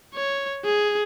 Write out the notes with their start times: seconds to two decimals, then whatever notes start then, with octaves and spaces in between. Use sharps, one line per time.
0.15 C#5
0.65 G#4